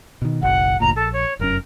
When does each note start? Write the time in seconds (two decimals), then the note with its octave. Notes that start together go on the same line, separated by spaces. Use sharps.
0.22 B2 D#3
0.42 F#1 B1 F#5
0.80 G1 D2 A#2 A#5
0.95 A#1 A4
1.12 C#5
1.39 F1 F#2 C#4 A#4